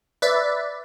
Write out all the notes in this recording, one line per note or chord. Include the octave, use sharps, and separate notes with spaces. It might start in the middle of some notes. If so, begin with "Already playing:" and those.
B4 D5 E5